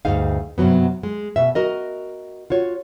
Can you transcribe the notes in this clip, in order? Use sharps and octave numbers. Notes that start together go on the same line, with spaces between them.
D2 G2 D#4 G#4 F5
G2 C3 D#3 F#3 B3
G#3
B2 E5
F#4 A#4 D#5
F4 F#4 C#5